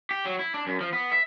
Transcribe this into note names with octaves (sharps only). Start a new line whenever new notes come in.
G4
F#3
E4
D4
F#2
F3
B3
E5